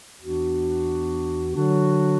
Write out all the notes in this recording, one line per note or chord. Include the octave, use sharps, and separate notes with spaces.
E2 E3 B3 D4 F#4
D3 F#3 D4 F#4